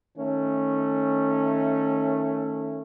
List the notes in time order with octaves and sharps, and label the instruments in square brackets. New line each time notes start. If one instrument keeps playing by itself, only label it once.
[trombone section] D#3 A3 C#4